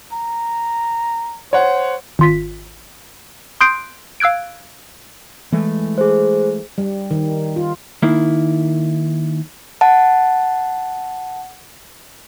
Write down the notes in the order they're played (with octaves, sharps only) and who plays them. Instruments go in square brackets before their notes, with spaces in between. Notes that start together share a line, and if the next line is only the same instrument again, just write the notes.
[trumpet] A#5
[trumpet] C5 [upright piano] C#5 F#5
[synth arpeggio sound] G#1 F4 B6
C6 D#6 F#6 G6 C7 D7
F5 E6 F#6 G#6 D7
[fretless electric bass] E3 G#3 A3
[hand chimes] G#4 C5
[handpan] G3
D#3
F4
[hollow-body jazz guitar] D#3 A#3 E4
[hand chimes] F#5 A5